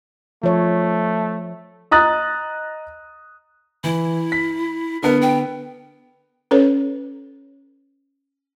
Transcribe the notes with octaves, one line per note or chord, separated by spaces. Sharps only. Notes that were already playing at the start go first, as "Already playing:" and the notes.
F3 A3 C#5
D#5 A#5 D#6 F#6 A6
E3 E4
B6
D3 B3 A#4
G5
C#4 A4 B4 C#5